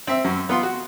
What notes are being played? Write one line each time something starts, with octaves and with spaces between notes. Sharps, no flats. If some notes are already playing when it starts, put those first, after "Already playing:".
C4 E5
F#2
B3 F4 C6
F#4